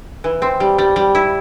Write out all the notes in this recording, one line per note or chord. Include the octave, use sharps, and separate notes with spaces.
E3
C4
G3
G3
G3
E4